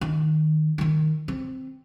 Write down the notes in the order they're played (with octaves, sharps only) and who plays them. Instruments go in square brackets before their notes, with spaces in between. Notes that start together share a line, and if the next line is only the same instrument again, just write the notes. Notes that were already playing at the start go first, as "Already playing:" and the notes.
[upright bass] D#3
D#3 E4
C4